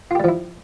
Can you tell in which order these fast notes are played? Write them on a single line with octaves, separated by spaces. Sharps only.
F4 G4 G3 F3 E4